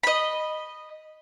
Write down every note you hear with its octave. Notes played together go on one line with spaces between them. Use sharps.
D#5 B5